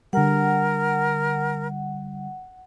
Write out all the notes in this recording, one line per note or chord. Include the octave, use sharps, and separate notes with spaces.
D3 G3 A#4 F#5